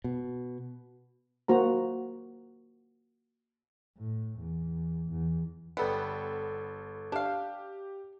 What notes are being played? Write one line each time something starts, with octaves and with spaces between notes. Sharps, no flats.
B2
A#3 F#4 C5 A#5
A2
E2
E2
G1 G3 B3 A4 B5
D4 G4 F5